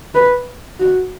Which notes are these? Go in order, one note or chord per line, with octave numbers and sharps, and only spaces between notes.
B4
F#4